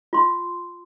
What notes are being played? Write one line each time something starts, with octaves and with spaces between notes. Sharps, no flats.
F4 C6